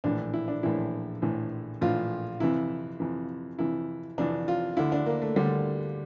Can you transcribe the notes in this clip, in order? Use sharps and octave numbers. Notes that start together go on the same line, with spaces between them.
A#1 A2 E3 D4
E4
D4
A#1 A2 E3 E4
A#1 A2 E3
A#1 A2 E3 F4
F2 C3 E3 E4
F2 C3 E3
F2 C3 E3 E4
F2 C3 E3 D4
F4
D2 D3 E4
D4
A#3
A3
D2 D3 G3